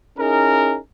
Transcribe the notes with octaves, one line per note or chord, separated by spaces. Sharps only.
C#4 D#4 E4 G#4 A#4